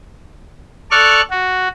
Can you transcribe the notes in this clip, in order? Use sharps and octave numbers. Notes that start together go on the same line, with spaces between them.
A4 D5 C#6 F6 F#6
F#4